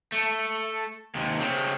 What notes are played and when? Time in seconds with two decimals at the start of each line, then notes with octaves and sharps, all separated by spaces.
0.12 A3
1.15 D#2 C3
1.40 C#3 C4